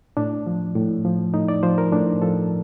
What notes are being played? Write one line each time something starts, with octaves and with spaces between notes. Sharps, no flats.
A2 D4
F3
A2
F3
A2 D#4
D5
F3 C5
A#4
A2 D4
F3 A4